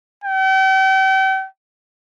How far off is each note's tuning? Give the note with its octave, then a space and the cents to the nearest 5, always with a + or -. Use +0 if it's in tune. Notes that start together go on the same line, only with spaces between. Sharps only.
G5 -40